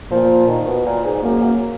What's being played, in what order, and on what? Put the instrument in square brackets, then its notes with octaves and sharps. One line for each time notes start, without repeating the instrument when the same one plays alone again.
[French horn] A#2 [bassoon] F3
[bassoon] D#3
B2
A#2
G#2
[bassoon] F#2 [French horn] A#3
[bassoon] F#2